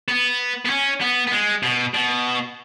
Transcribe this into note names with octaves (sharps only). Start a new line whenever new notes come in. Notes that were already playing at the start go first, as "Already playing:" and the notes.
B3
B3
C#4
B3
B3
G#3
B2
B2